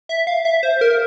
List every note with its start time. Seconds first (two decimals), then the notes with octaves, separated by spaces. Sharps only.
0.09 E5
0.27 F5
0.45 E5
0.63 C5
0.81 A#4